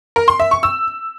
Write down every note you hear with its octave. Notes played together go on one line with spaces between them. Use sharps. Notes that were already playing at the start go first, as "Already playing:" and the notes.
A#4
C6
E5
C#6
E6